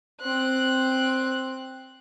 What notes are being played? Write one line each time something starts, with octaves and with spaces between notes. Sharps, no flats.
C4 F#6